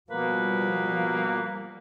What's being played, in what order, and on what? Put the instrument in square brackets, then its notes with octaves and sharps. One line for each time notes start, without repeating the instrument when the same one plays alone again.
[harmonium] B2 B3 [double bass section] F3 G3 [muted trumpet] A#3 [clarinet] B4